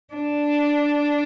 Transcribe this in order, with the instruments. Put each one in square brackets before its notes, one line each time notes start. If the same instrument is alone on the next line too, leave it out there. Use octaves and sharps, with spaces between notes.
[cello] D4